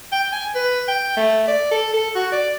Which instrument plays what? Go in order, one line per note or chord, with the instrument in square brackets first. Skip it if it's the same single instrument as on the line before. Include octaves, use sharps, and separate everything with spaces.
[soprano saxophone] G5
G#5
B4
G5
A3
D5
A4
A4
F#4
D5